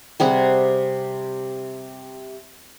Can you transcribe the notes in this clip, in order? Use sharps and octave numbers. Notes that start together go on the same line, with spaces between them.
C3 G3 G#4 F#5